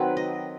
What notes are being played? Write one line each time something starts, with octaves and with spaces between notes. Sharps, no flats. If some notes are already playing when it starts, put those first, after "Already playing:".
Already playing: D#3 F#3 C4 B4
D#5